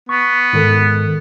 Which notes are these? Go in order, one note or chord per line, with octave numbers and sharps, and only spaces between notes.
B3 C#6
G#2 D#3 A4